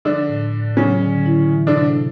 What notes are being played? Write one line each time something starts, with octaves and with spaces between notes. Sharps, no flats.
D3 F3 D4
A2
A2
C#3 F#3 C#4
D3
E4
E3
D3 D4
C3